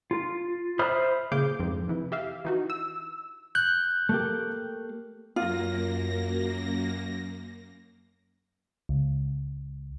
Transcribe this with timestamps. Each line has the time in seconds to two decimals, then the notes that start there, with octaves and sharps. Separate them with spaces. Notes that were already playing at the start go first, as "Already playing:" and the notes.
0.11 F4
0.79 C5 E5 B5 D#6 F6
1.32 A#2 C#3 G#4 F5 D6 G6
1.60 F2 G#2
1.88 C3 E3 E4
2.12 G4 E5 F5
2.45 E3 D#4 F#4
2.70 E6
3.55 F#6 G6
4.09 A3 A#3 G4
5.36 F#2 A#3 F4 A#6
8.89 C#2